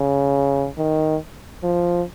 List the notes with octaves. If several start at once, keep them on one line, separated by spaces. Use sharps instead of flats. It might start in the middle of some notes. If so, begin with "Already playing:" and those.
Already playing: C#3
D#3
F3